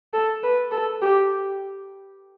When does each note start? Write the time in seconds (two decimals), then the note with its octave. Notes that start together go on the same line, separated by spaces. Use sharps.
0.14 A4
0.43 B4
0.72 A4
1.02 G4